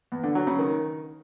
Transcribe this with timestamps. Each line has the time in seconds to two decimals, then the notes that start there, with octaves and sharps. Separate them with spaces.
0.12 E2
0.23 D3
0.35 F#3
0.47 C#3
0.59 D#3